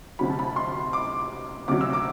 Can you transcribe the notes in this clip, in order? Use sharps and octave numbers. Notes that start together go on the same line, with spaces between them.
D2 C3 F#3 B5
A5
B5
C6
D6
D2 C3 F#3 D6
E6
D6